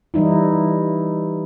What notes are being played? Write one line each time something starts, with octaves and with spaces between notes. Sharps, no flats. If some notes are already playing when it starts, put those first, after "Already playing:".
E3 G3 D#4 E4